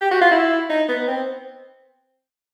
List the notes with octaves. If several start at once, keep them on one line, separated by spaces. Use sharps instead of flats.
G4
F#4
F4
E4
D#4
B3
C4